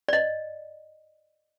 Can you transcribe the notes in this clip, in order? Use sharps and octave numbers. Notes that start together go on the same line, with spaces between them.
D5 D#5